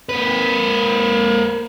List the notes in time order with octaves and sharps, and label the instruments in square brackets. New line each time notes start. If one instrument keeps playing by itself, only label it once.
[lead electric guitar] A#3 B4